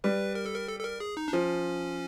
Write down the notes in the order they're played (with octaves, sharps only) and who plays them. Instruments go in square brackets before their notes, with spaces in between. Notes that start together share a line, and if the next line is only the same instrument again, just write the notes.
[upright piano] G3 [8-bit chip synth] B4
[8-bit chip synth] A#4
A4
A#4
A4
A4
A#4
G#4
D#4
D4
[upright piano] F3 [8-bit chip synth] C#4